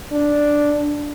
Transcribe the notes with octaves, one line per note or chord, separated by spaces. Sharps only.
D4